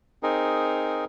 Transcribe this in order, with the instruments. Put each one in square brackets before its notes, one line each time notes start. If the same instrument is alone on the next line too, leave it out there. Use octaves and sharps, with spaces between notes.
[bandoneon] C4 D#4 G#4 A#4